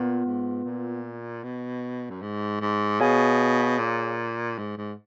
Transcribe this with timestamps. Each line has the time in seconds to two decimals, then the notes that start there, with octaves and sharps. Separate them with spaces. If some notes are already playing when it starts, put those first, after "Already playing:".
Already playing: A#2 B3 F4 B4
0.25 G#2
0.65 A#2
1.43 B2
2.10 F#2
2.22 G#2
2.61 G#2
3.00 B2 G#4 C#5 F5 G#5
3.79 A#2
4.58 G#2
4.77 G#2